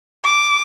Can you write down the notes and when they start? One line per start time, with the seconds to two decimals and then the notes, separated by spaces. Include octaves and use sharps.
0.25 D6